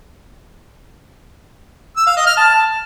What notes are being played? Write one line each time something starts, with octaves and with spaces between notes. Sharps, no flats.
E6
F5
D#5
F6
A5